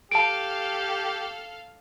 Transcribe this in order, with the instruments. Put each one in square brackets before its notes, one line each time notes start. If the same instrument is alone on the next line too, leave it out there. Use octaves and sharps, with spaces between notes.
[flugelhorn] G4 [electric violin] A4 F5 [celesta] A5 D7